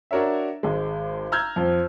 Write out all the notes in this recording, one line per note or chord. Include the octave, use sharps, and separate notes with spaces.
D4 F#4 A#4 C#5 E5
G#1 G#3
A#5 E6 F6 G6 G#6
F2 F3 F4